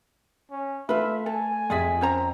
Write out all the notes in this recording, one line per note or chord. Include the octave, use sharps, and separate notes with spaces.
C#4
A3 F4 B4 E5
A4 G#5
F2 F4 G#4 E5 B6
C#4 C5 A#5